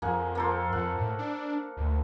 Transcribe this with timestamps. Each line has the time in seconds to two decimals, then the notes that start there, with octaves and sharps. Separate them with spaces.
0.02 F2 A#3 G#4 F#5
0.35 A#3 A4 C5
0.73 F2 F#5
0.97 A2
1.18 D4
1.77 D2